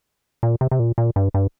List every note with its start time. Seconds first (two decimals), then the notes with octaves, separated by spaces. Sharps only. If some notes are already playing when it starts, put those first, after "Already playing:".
0.43 A#2
0.61 C3
0.71 C3
0.79 A#2
0.98 A#2
1.16 G2
1.34 G2